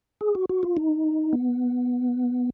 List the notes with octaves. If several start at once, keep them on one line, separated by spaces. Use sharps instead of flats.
G#4
F#4
F#4
F4
D#4
B3